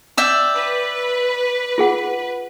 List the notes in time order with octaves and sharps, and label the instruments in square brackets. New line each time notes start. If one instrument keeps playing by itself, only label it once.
[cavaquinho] D5 E5 G5
[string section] B4
[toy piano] F4 G#4 F#5